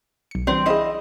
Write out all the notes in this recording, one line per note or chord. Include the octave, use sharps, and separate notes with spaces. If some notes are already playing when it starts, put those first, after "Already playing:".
B1 C#7
E3 F#3 G3 C4
E4 G#4 C5 D#5 F5